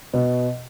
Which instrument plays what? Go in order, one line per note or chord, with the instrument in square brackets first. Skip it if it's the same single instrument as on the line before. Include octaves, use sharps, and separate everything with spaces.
[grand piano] B2